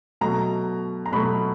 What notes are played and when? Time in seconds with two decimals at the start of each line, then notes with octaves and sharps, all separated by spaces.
0.21 B2 F#3 A3 A#5
1.06 A#5
1.12 B2 F#3 A3 B5